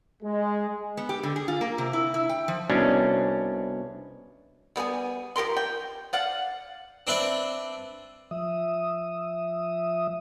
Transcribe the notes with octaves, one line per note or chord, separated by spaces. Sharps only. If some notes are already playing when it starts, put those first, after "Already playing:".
G#3
B3
G4
D3
G#4
F4
A#3
C3
E4
E4
G5
F3
C2 B2 C#4 D4
G3 B3 G#4 G#5
F3 G4 A#4 C6
G5
D5 F5 F#5
C4 D4 B4 E5
F3 E5 D#6